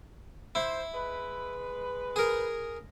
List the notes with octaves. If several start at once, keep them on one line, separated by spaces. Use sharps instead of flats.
E4 C5
G#3 B4
G#4 A#4